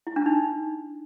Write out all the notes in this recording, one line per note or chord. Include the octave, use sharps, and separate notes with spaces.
E4
D4
D#4